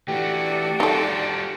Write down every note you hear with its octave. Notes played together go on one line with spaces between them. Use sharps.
E3 A3 D4 F#4 G4 D5
G3 D#4 F4 A4